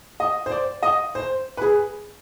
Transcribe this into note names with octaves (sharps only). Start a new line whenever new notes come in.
D#5
C5
D5
D#5
C5
B4
G#4